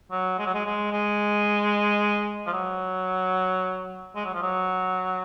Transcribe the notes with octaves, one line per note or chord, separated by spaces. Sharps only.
F#3
G#3
F#3
G#3
G#3
G#3
F3
F#3
G#3
F#3
F3
F#3